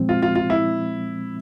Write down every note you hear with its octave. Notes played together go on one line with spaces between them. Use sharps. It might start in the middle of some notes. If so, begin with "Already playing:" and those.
Already playing: A#2 F3 G#3 C4
F4
F4
F4
E4